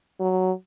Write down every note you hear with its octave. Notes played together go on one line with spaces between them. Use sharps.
F#3